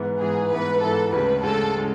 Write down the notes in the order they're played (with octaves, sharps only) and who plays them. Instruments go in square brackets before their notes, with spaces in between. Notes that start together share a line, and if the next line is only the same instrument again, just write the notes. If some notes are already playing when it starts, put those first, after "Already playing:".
Already playing: [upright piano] G#2 E3 B3
[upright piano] G#2 E3 B3 [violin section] G#4
[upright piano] G#2 E3 B3 [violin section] B4
[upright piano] G#2 E3 B3 [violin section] A4
[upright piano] D2 C#3 G#3 [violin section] B4
[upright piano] D2 C#3 G#3 [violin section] A4
[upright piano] C#3 G#3